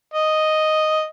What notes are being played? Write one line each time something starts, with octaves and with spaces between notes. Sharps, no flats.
D#5